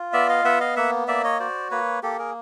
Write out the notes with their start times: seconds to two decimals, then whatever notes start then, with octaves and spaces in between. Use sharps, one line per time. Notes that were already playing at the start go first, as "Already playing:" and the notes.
Already playing: F4
0.13 B3 D5 E5
0.28 D#5 F5
0.45 B3 E5 F#5
0.60 D#5 F5
0.76 A#3 E5 F#5
1.08 A#3 D5 E5
1.24 C#5 D#5
1.40 F#4 C5 D5
1.71 A#3 B4 C#5
2.03 A#3 G4 A4
2.19 G#4 A#4